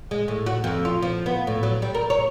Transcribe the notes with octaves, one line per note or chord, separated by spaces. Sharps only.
G#3
A2
F#4
F2
F4
F3
B3
A2
F#3
G3
A#4
C#5